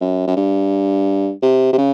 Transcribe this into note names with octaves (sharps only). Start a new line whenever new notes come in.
F#2
F#2
G2
C3
C3
C#3